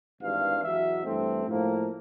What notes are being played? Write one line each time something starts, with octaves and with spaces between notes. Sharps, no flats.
G#1 G2 E3 F5
E2 B2 F#3 E5
G2 E3 A3 C4
A2 F3 A#3